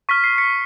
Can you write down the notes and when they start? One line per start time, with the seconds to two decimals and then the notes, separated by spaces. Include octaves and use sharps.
0.09 C#6 F6 B6
0.24 C7
0.38 B6 C#7